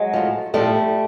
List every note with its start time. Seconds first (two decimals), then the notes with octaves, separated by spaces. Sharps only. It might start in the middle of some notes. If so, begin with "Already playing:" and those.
Already playing: F#3 G#3
0.13 A2 F3
0.54 A2 F3 G3 A3